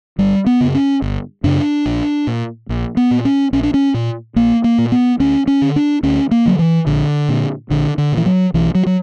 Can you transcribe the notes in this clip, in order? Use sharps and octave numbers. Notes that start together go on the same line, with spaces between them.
G1 G3
B3
F#2 C#3
C#4
G1
F#2 C#3 D4
A#1
A#2
A#1
B3
A#2
C#4
A#1 C#4
D4
C#4
A#2
A#1 A#3
A#3
A#2
B3
D2 C#4
C#4
D3
D4
D2 C#4
A#3
D3 F#3
E3
A#1 D3
A#2
A#1 D3
D3
A#2
E3
F#3
B1 E3
F#3
F#3